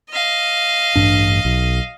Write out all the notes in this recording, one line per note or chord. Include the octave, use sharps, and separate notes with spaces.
D#5 F5
A1 G2 D4
B1